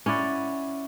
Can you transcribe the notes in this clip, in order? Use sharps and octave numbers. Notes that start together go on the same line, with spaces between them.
C#4 E4 D5 F#5